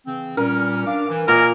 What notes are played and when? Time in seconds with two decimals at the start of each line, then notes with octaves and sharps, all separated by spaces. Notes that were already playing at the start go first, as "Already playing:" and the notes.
0.06 C#3 E3 C4
0.37 A#2 G3 C#4 A#4
0.86 D4 F5 D6
1.09 E3
1.28 A#2 A#4 D#5 G#5